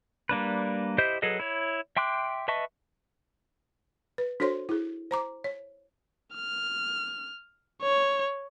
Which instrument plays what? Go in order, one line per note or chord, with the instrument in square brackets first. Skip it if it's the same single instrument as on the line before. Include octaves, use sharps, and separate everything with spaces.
[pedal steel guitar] G3 A#3 D4 B4
E4 G4 C5 D#5 G6
F#3 G#4 A4 B4 D#5
E4 C#5
E5 G5 C6 D6 F#6
B4 D#5 E5 A5 C#6
[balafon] B4
D4 F#4 A4 C5 C#5 C6
E4 G#4
C5 A#5 D6
C#5
[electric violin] F6
C#5